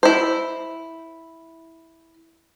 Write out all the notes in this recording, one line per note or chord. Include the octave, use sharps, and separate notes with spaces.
E4 C5